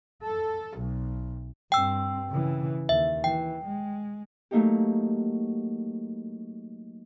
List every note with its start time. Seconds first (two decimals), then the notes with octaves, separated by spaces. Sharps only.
0.23 A4
0.77 B1
1.72 G2 C4 G5 E6
2.30 C#3 E3
2.89 D#2 E5
3.24 E3 G5
3.66 G#3
4.51 F#3 A3 A#3 D#4 G4